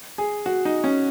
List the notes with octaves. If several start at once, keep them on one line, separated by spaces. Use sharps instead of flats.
G#4
F#4
D#4
C#4